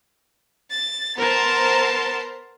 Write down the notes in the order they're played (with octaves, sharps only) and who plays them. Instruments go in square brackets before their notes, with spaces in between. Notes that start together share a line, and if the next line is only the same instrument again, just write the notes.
[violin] A6
[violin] B3 [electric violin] A#4 A5 [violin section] C5 A#5 C6